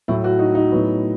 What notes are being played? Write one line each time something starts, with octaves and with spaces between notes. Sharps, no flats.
A2 F#3 A3 E4
F#4
D#4
D#4
A2 F#3 B3